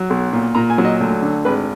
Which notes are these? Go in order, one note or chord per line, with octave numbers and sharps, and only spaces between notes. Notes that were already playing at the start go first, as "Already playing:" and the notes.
Already playing: F#3
B1
A#2
A#2 A#5
G#5
F#3
D#5
D2
D3
G#1 B4